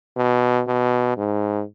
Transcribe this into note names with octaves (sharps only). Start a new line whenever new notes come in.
B2
B2
G#2